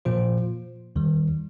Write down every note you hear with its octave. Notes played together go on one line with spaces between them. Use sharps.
A#2 F3 A#3 F4 C5
D#2 D#3 G3